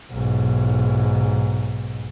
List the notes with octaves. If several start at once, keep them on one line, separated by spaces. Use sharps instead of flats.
B1 G#2